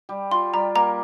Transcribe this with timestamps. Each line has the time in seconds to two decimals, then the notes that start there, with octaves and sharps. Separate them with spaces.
0.09 G3
0.31 F4 C6
0.54 G3 A#5
0.75 A#3 A#5